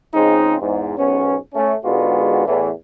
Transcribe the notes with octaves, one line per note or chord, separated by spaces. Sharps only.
C#3 F3 G#3 C4 D#4
E2 G#2
B1 G#2 B3 C#4
A3 C#4
G#2 D3 G#3 B3 F4 F#4
E2 A2 E3